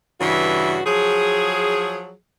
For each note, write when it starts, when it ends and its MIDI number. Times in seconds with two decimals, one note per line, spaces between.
0.20 0.80 43
0.20 0.80 49
0.20 0.80 52
0.20 0.80 66
0.20 0.80 76
0.86 2.13 53
0.86 2.13 54
0.86 2.13 68